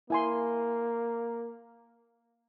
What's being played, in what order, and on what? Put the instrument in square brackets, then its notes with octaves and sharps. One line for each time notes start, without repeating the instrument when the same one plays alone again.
[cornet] A#3 [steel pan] E4 G#5 C6